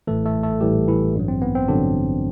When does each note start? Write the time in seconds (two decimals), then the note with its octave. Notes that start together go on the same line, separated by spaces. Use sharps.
0.07 A1 A2 E3 A3 A4
0.25 A3 A4
0.43 A3 A4
0.61 A1 A2 E3 G3 G4
0.88 E3 E4
1.15 A1 G2 F#3
1.28 C4
1.42 B3
1.55 C4
1.68 A1 G2 D3 F#3 D4